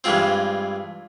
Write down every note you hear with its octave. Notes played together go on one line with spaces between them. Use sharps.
G2 E3 G#3 C4 F4